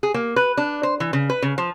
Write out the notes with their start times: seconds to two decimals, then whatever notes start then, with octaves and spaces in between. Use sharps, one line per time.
0.03 G#4
0.14 A#3
0.36 B4
0.57 D4
0.83 C5
1.00 E3
1.13 C#3
1.30 B4
1.42 C#3
1.58 F3